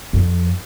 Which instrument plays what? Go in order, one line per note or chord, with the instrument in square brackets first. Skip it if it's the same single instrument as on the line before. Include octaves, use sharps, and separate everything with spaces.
[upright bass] F2